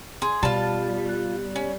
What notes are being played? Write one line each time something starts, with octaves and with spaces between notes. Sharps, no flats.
G#4 C6
B2 G3 F4 A5 B5
F#6
C#4